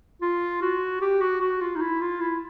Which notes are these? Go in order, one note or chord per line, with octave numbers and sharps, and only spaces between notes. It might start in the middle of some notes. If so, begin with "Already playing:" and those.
F4
F#4
G4
F#4
F#4
F4
D#4
E4
F4
E4